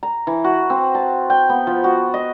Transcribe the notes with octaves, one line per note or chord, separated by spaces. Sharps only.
A#5
E3
F#4
C4
A5
G5
B3
F3
F#4
D#5